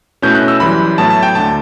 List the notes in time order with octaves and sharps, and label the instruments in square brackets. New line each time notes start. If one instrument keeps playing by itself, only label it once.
[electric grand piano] B2 A3 C#4 E4 G6
F#6
E6
F#2 E3 G3 B5
A2 F#3 B3 E4 A5
A5
G5
D2 D3 A3 A5